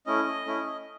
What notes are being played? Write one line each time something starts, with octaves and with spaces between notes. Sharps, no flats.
A3 C#4 E4 D#5
A3 C#4 E4